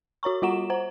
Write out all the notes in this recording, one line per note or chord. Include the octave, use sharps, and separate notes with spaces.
F#4 C#5 A#5 C#6
G3 F4 F#4 F#5 A#5 E7
C5 F#5 A#5